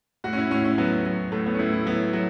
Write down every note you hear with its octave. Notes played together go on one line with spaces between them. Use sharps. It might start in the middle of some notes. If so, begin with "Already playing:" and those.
A2 F#4
C#4
E4
A2 C#4
C#4
F#3 B3
F#3
A2 A3
B3
C#4
A2 E4
E4
F#3 B3
F#3